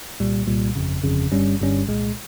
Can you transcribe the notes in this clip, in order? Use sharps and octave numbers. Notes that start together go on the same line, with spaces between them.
C2 A#2 G3
C2 A#2 G3
G1 F2 C#3
G1 F2 C#3
G1 G2 G3 C#4
G1 G2 G3 C#4
C2 A#2 G#3